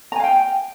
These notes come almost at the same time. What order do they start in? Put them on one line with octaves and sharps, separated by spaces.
A#5 G#5 F5 G5